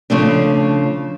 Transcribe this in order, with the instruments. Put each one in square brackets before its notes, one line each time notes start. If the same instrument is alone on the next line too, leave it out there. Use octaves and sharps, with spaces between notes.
[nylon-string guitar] C#3 F3 A3 D4